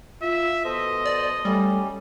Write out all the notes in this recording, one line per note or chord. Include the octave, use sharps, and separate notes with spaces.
F4 E5
B2 A4 C5 D#5
D5
G3 A3 C#4 G4